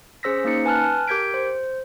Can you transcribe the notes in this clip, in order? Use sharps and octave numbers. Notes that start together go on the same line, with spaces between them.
C#4 G#4 C5 E6 A#6 B6
A#3 C#4 D#4 C#7
B4 G#5 A5 F6 F#6
G4 A#4 G6 G#6 B6 D7
C5